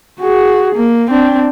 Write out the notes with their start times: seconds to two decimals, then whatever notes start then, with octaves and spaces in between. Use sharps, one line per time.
0.21 F#4 G#4
0.75 A#3
1.10 C4 D4